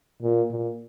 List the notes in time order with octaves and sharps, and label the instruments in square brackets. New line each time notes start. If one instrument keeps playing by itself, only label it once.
[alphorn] A#2
A#2